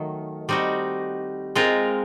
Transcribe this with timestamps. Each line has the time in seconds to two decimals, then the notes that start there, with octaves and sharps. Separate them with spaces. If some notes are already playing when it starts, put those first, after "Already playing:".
Already playing: D#3 F#3 A3
0.49 G3 C4 D#4 F#4
1.55 G#3 C4 F4 A#4